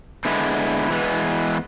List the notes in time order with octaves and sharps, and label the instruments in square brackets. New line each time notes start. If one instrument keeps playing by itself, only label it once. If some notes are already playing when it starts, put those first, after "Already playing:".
[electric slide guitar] D3 G#3 B3 E4
E3 G#3 B3